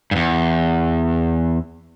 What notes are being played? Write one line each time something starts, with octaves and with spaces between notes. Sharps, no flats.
E2 G2